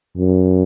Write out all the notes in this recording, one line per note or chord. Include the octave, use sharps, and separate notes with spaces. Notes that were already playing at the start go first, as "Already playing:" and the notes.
F#2